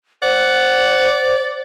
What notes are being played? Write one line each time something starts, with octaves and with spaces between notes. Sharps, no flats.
C5 D5 F#5